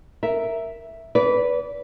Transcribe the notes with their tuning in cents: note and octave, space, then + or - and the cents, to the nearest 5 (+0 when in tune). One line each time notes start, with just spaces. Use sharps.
A#4 +0 E5 +0
B4 +0 D5 -30